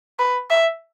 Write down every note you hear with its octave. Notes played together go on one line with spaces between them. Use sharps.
B4
E5